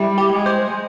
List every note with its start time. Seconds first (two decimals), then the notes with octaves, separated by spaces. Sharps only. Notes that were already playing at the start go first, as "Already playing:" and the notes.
Already playing: G3 E4
0.18 G4
0.32 G#3
0.46 C5